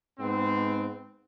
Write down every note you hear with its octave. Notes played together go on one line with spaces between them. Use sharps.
G#2 B3 C4